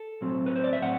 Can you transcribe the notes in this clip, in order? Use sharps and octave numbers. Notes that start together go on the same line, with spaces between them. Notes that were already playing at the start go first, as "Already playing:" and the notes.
Already playing: A4
B1 A2 F#3 C4
B4
C5
D5
E5
A2 F#3 C4 F#5